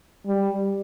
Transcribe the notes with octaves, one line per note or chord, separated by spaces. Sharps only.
G3